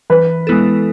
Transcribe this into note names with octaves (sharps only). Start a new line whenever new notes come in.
E3 B4
G#3 B3 E4 A4